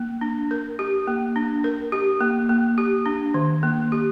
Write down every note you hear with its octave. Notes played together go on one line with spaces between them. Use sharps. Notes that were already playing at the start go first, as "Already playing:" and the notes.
Already playing: A#3
D4
A#4
G4
A#3
D4
A#4
G4
A#3
A#3
G4
D4
D#3
A#3
G4